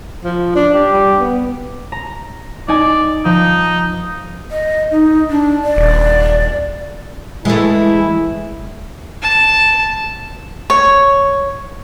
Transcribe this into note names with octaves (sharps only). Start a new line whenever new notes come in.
F3
D4
D4 G4
G3
B3
A#5
D#4 D5 G#5
F3 D#4
D#5
D#4
D4
D5
D#1
E3 G#3 A3 E4
A5
C#5